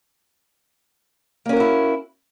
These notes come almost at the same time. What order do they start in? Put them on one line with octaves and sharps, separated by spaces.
A#3 C#4 A#4 F#4 E4